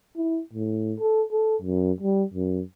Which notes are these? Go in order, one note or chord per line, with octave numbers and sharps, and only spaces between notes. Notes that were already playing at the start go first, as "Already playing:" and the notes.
E4
A2
A4
A4
F#2
G3
F#2